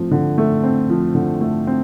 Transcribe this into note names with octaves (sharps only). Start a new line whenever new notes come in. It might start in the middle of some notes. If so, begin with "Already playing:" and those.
Already playing: F3 A3 C4
D3
A3
C4
F3
D3
A3
C4